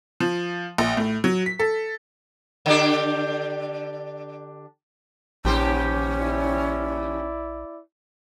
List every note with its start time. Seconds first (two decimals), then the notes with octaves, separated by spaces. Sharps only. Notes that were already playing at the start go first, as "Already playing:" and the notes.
0.20 F3
0.78 A#1
0.97 A2
1.24 F#3
1.46 B6
1.59 A4
2.66 D3 D4 G4
5.45 A#1 D#2 C#4 G4 C5
6.21 E4 D5